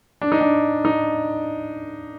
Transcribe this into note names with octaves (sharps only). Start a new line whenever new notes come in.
D4
D#4
D4
D#4